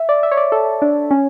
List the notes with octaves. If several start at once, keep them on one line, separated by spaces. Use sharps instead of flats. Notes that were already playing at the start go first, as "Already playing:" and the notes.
Already playing: E5
D5
E5
C#5
D5
A4
D4
C#4